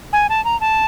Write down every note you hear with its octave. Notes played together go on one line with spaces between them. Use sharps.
G#5
A5
A#5
A5